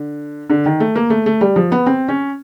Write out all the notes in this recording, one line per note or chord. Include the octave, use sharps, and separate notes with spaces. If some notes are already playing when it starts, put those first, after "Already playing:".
Already playing: D3
D3
D#3
A3
A#3
A3
A3
G3
F3
B3
C4
C#4